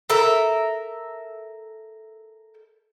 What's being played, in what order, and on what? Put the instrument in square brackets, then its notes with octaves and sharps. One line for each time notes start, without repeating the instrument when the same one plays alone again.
[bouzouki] A4 A#4 E5